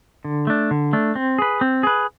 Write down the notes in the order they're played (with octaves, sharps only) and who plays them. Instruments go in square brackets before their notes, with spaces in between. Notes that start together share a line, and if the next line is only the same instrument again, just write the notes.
[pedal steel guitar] D3
A3 D4
D3
A3 D4
C4
G#4 B4
C4
G#4 B4